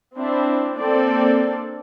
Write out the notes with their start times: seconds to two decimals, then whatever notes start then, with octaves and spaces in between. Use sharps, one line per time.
0.16 C4 D4 E4
0.76 A#3 C4 D4 A4 D5